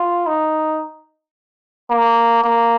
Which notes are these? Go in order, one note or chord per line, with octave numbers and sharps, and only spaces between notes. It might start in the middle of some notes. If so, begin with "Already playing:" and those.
Already playing: F4
D#4
A#3
A#3